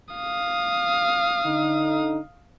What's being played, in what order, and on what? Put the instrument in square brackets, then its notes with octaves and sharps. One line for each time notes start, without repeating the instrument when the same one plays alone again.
[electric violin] F5 D#6
[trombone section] D3 D#4